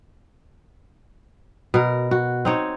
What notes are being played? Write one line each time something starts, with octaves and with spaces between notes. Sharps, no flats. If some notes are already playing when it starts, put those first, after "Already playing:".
B2 A#4
F#4
C4 D#4 C#5